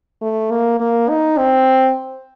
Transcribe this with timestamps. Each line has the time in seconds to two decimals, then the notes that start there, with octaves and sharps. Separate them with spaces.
0.22 A3
0.51 A#3
0.80 A#3
1.09 D#4
1.38 C4